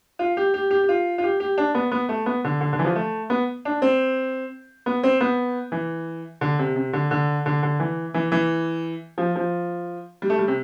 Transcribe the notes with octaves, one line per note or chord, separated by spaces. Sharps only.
F4
G4
G4
G4
G4
F4
F4
G4
G4
D4
B3
B3
A3
B3
D3
D3
D3
E3
F3
A3
B3
D4
C4
B3
C4
B3
E3
D3
C3
C3
D3
D3
D3
D3
E3
E3
E3
F3
F3
G3
A3
G3
C3